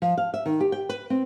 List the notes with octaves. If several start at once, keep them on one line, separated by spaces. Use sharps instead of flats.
F3
F5
E5
D#3
G4
G5
B4
C4